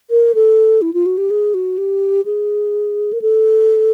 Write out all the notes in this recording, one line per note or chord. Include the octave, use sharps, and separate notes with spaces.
A#4
A4
E4
F4
F#4
G4
G#4
F#4
G4
G#4
A#4
A4